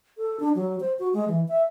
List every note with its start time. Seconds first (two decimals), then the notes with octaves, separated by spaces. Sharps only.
0.18 A4
0.40 D4
0.55 F#3
0.80 C5
0.99 F#4
1.14 G#3
1.28 E3
1.48 E5